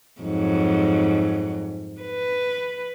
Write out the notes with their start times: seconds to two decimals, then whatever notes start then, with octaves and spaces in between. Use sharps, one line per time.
0.21 F2 G#2 F#3
2.02 B4